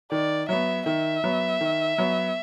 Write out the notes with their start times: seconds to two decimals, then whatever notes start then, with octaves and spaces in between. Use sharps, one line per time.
0.11 D#3 D5
0.49 F#3 B3 E5
0.86 D#3 E5
1.24 F#3 B3
1.61 D#3
1.98 F#3 B3